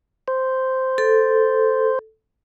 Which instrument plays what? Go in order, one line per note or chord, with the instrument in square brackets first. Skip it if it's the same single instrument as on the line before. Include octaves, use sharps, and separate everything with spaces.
[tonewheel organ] C5
[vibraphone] A4